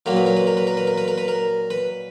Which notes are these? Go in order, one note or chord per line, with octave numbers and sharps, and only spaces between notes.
A#2 F#3 A#3 A#4
B4
A#4
B4
A#4
B4
A#4
B4
A#4
B4
A#4
B4
A#4
B4